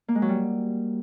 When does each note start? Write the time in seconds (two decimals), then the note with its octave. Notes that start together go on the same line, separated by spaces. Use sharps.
0.08 A#3
0.15 G#3
0.22 F#3
0.29 G3